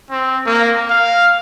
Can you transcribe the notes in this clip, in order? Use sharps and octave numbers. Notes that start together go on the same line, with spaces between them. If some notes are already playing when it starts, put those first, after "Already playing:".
C4
A#3
F5